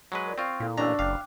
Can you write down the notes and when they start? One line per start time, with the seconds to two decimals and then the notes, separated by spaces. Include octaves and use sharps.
0.12 F#3 G#3 B4
0.26 A#4 D5
0.38 C4 F4 C#6
0.60 A#2 E4 A4 F5
0.78 A1 D4 A#5 C#6 E6
0.99 F#1 F5 G5 D6 F#6